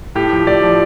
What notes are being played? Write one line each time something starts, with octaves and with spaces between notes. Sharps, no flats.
A2 G4
F3
A2 D5
F3